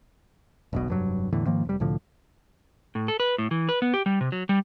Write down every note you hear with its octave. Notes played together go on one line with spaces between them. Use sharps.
E1 B1 B2
F1 G2 F#3
E2 A2 D3 E3
G#2 D#3 F3 A#3
F1 G3
C2 A2 D3 F3
A2
A4
B4
A2
E3
B4
B3
G4
G3
C3
F#3
G3